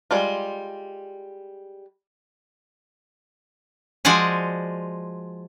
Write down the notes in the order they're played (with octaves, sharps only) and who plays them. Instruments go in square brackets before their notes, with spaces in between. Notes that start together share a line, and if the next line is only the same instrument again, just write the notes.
[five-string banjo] G3 G#3 F4
[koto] F3 G#3 F#4 D5 F#5 G#5